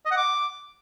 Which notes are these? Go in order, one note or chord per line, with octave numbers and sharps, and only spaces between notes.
D#5
F#5
D6